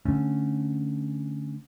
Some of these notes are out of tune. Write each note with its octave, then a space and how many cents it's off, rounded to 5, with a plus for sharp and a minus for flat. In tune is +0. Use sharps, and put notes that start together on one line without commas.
D3 +0 A3 +0 C#4 -5